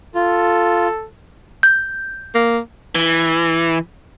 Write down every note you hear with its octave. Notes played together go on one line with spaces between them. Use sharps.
F4 A4
G6
A#3
E3